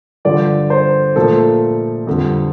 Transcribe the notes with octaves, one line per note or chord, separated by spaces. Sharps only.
G2 D3 F3 D5
C5
A#2 F3 A3 A4
F2 D3 G3